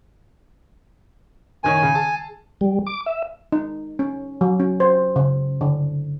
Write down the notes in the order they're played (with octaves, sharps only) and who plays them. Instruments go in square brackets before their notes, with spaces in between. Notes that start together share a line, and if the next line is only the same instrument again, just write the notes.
[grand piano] F#1 D#3 C#5 [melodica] G#5
[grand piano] C#3
G#4 A5
[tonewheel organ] G3
D6
E5
[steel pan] D#4
C#4
F#3
C#4
C5
C#3
D3